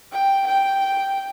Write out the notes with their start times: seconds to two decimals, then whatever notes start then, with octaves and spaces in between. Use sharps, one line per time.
0.12 G5
0.47 G5